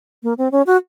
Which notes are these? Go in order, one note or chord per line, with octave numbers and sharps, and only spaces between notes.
A#3
C4
C#4
F#4